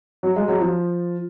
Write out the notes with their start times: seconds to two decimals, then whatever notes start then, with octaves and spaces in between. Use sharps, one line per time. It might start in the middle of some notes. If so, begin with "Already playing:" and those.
0.23 F#3
0.36 G#3
0.48 F#3
0.60 F3